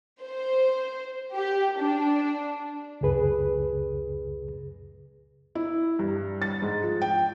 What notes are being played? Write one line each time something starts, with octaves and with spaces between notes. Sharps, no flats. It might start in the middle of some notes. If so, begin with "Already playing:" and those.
C5
G4
D4
C#2 F#2 C#3 G#4 B4
E4
G2
A6
G#2
F3
G5